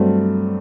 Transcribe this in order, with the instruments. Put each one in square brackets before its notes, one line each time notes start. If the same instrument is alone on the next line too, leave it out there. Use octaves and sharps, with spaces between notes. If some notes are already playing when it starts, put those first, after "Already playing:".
Already playing: [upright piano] G2 F#3 A3 C4